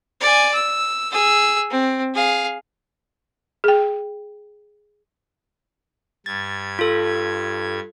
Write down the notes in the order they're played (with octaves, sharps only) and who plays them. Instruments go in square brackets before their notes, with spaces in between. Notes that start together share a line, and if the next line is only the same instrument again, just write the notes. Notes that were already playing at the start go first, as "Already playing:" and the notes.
[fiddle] D5 G#5
E6
G#4 E6
C4
G#4 F5
[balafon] G#4 G5
[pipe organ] G2 G#6 [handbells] A6
[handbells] F4 A4